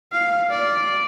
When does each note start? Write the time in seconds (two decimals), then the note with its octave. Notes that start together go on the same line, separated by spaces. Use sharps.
0.12 F5
0.51 D5